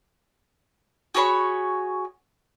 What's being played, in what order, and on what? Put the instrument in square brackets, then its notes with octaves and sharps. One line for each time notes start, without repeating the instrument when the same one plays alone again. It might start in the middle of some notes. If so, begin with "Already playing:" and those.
[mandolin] F#4 G#4 C#5 B5